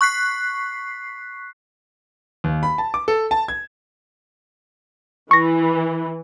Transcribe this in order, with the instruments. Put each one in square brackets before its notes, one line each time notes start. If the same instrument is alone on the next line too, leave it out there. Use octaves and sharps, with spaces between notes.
[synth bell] C#6 F#6 B6 C7
[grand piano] D#2
B5
A5
D6
A4
A5
G#6
[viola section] E3 [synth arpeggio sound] C#6 A#6